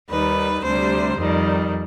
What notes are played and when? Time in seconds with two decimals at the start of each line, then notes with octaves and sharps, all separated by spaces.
0.10 D#2 D#3 G3 B4
0.63 D2 C3 G3 C5
1.17 F2 D#3 G3